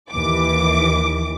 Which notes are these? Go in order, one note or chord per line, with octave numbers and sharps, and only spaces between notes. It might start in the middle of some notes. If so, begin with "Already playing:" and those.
D#2 E3 D6